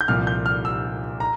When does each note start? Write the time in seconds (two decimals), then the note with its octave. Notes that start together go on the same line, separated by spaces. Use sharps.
0.01 G6
0.08 C2 A#2 F3 F6
0.27 G6
0.46 F6
0.65 E6
1.20 A#5